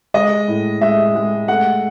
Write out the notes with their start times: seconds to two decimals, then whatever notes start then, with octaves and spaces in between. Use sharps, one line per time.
0.14 G#3 D#5
0.48 A2
0.81 G#3 E5
1.15 G#3
1.48 A3 F#5